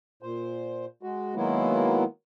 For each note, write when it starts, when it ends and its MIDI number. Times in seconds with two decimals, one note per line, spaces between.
0.23 0.85 46
0.23 0.85 72
1.03 1.35 56
1.03 1.35 66
1.36 2.04 51
1.36 2.04 54
1.36 2.04 56
1.36 2.04 58
1.36 2.04 59
1.36 2.04 64